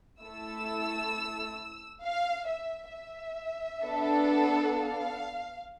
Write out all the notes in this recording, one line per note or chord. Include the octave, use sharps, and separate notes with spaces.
A3 E4 A4 E6
F5
E5
E5
B3 D4 A4
F5